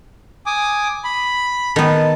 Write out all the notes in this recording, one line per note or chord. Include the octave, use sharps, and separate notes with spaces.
G#5 D6 D#6
B5
D#3 B3 A5